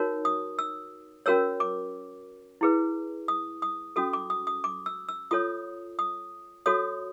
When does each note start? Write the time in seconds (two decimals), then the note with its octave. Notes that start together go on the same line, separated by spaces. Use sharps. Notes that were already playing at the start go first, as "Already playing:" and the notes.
Already playing: D#4 F#4 A#4 C#5
0.25 D#6
0.59 E6
1.26 C#4 F#4 A#4 C#5 E6
1.60 D6
2.61 E4 G#4 B4
3.28 D#6
3.62 D#6
3.96 C#4 F#4 A4 D#6
4.13 D6
4.30 D#6
4.47 D#6
4.64 D6
4.86 E6
5.09 E6
5.31 F4 A4 C#5 D#6
5.99 D#6
6.66 F#4 A4 C#5 D#6